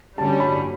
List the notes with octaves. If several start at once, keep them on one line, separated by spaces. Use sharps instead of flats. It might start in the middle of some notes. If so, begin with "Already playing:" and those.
G2 D3 G3 C#4 A5
B5